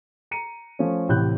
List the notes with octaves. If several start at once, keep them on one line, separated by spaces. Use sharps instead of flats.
A#5 C#7 D#7
F3 A3 C#4
A1 A2 C3 F#6 G6